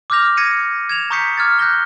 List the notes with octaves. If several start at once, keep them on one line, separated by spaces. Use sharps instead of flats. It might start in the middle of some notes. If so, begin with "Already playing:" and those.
D6 E6 F6 G6 A#6 F7
G#6 A#6 C#7 D#7
G#6 E7 F7
A#5 C#6 D#6 G6 B6 C#7
D6 F6 G#6 A6
F#6 G6 A#6 G7